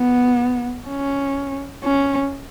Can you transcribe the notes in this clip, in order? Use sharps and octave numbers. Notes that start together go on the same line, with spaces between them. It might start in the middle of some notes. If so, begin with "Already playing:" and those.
Already playing: B3
C#4
C#4